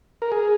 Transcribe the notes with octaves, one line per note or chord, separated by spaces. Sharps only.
A#4
G#4